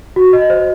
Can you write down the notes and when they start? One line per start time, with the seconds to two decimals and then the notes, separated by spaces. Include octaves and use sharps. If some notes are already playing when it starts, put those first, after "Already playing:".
0.16 F#4
0.33 D#5
0.50 C5